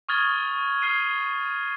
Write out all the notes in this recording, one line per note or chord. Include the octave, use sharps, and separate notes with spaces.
C#6 D#6 F6 G#6 A6 G7
F6 G#6 C7 D#7